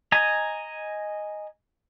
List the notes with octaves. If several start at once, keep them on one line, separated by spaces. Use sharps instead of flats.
D#5 G#5 A#5